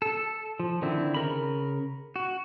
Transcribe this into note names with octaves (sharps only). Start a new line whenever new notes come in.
A4
F3
D3 D#3 C4 E4
C#3 A#4 B5
F#4